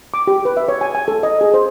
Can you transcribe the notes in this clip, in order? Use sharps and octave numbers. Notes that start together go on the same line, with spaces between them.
D6
G4
B4
E5
C#5
G#5
G#5
A4
D#5
G#4
C5